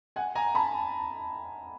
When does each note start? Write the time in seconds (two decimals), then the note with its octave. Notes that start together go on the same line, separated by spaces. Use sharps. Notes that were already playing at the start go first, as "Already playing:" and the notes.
0.16 F#5 G#5
0.35 G#5 A#5
0.55 A5 B5